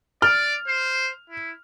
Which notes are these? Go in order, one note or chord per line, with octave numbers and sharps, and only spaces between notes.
D5 F6
C5
E4